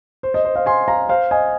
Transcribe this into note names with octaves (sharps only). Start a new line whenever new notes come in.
C5
D#5
C5
C5 F5
G#5 C6
F5 A#5
C5 F5
D#5 G#5